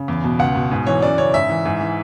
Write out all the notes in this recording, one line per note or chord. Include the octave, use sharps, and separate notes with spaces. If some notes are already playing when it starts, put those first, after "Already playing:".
Already playing: C#3
E2
B2
C#2 F#5
B2
G#2
E3 C#5
F#2 D5
C#3 C#5
G#2 E5
E3
G#2
E3